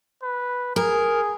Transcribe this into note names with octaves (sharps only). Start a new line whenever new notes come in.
B4
G#4 A#4